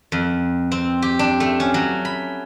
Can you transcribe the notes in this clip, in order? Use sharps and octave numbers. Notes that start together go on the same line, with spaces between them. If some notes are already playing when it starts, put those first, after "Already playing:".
F2
C4
G4
D4
A3
C#4
F#3
B5